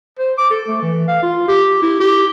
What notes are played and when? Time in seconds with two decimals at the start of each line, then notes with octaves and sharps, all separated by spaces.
0.19 C5
0.38 D6
0.51 A4
0.68 A3
0.82 E3
1.08 F5
1.23 F4
1.48 G4
1.82 E4
2.00 G4